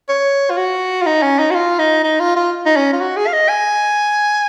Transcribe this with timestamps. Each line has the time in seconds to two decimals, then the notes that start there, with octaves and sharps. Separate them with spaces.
0.09 C#5
0.50 F4
0.57 F#4
1.02 F4
1.06 D#4
1.22 C#4
1.39 D#4
1.51 F#4
1.55 F4
1.79 D#4
2.04 D#4
2.20 F4
2.36 F4
2.66 D#4
2.76 C#4
2.93 F4
3.00 F#4
3.17 G#4
3.27 F5
3.33 D#5
3.49 G#5